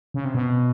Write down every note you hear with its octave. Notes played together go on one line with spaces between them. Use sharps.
C#3
C3
B2